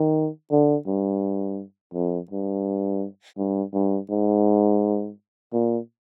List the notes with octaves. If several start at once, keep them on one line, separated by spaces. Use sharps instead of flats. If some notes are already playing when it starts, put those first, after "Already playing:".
Already playing: D#3
D3
G2
F2
G2
G2
G2
G#2
A#2